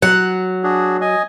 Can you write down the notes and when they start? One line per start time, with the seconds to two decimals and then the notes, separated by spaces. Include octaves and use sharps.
0.02 F#3 F#5
0.63 D4 F#4 G#4
1.01 D#5 G#5